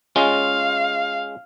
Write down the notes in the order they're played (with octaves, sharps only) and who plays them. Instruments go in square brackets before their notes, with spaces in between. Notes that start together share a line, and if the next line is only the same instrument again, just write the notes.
[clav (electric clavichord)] G#3 C#4 F4 [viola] F5